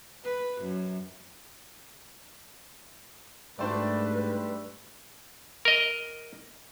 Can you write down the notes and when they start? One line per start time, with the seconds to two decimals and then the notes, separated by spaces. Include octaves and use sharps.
0.24 B4
0.61 F#2
3.59 G#2 G3 A3 D4 B4 C5 D5
5.65 A#4 D#5